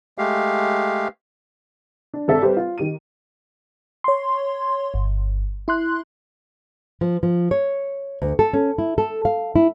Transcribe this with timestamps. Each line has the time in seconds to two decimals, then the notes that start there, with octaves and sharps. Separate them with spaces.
0.18 G#3 A3 G4 F5
2.14 D4
2.28 G#1 A4 E5
2.42 G3 G4 B4 C5
2.57 F4
2.78 D#3 G4 D#7
4.04 C#5 C6
4.94 G1
5.68 E4 C6 F#6
7.01 F3
7.23 F3
7.51 C#5
8.22 D2
8.39 A4
8.53 C#4
8.78 E4
8.98 A4
9.25 F5
9.56 E4